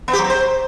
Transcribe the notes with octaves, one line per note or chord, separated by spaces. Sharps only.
B3
G4
F#3
C4
C5